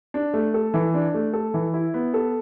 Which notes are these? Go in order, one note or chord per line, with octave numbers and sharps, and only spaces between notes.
D4
A3
A4
E3
D4
A3
A4
E3
E4
B3
A4